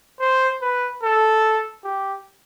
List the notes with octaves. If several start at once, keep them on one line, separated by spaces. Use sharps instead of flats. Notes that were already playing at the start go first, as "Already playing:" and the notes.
C5
B4
A4
G4